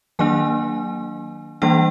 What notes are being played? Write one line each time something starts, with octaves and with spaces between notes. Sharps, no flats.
D#3 F#3 A#3 D4 G#5
E3 G3 A#3 D4 G5